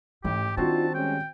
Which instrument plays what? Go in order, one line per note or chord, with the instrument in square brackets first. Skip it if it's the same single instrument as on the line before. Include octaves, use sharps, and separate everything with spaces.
[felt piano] A1 [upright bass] G#2 E3 [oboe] G4
[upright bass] D#3 [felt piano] C4 F#4 C5 [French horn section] D4 D#4 F4 [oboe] A5
[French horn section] G3 G#3 C#4 [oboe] G5